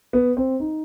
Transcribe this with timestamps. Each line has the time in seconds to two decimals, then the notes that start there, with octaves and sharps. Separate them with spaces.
0.13 B3
0.37 C4
0.60 D#4